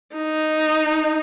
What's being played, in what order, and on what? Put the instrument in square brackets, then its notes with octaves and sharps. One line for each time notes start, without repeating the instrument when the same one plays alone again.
[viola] D#4